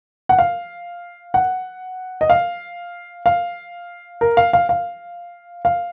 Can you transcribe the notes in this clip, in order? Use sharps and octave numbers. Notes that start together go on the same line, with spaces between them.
F#5
F5
F#5
D#5
F5
F5
A#4
F5
F5
F5
F5